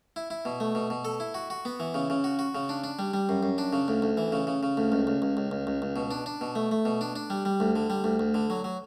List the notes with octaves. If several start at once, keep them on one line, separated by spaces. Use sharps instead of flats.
E4
E4
B2
A3
B2
B2
A4
E4
F#4
F#4
B3
E3
C#3
C#3
F#4
F#4
C#3
D4
D4
G3
G3
F#2
F#2
D4
C#3
D2
D2
E3
C#3
C#3
C#3
D2
C#2
C#2
C#2
C#2
C#2
C#2
C#2
B2
D4
D4
B2
A3
A3
B2
D4
D4
G3
G3
D2
D3
G3
D2
D2
D3
F#3
F#3